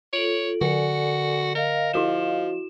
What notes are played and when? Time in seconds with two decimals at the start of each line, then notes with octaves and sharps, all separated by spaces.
0.13 F4 A4 C#5 D7 F#7
0.61 D3 F#4 A4 D5 G#5 C#7
1.55 A#4 D#5 F5
1.93 F3 E4 F#4 E7